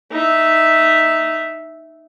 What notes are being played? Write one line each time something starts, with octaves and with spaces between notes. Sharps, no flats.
D#4 E5